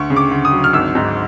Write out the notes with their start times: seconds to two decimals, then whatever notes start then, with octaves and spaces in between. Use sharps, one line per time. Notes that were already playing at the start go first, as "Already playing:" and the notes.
Already playing: D2 C#6
0.10 C#3
0.16 D6
0.31 D2
0.45 D#6
0.52 F#3
0.64 F6
0.73 G#1 E6
0.95 G#2